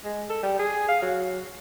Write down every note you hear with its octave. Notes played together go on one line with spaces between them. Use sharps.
G#3
A4
G3
G#4
F5
F#3